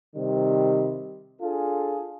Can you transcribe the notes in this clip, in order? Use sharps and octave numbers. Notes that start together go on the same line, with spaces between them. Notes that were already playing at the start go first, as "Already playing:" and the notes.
C3 D#3 G3
D4 F4 G#4 A4